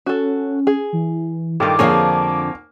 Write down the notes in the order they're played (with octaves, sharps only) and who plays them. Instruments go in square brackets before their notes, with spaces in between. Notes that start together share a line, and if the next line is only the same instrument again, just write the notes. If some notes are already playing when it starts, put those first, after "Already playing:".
[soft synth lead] C#4 [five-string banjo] F#4 A4
[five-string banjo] G#4
[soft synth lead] E3
[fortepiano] G2 D#3 [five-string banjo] F4 A4 [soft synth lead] D6
[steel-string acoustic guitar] F2 D3 F3 [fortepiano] A#3 C#5 G#5 [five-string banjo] G#4 F5